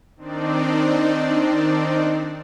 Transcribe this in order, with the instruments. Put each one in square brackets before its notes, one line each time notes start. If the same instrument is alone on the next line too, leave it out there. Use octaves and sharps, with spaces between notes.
[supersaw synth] D#3 C4 D4 D#4 D5